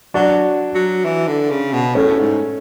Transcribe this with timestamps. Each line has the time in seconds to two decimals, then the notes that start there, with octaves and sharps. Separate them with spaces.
0.14 F#3 D4 F#4
0.75 F#3
1.05 E3
1.27 D3
1.50 C#3
1.73 B2
1.95 A2 A3 C#4
2.19 G#2